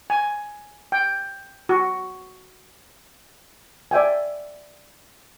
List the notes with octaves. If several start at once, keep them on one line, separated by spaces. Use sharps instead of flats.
G#5
G5
F#4
D5 E5 G5 G#5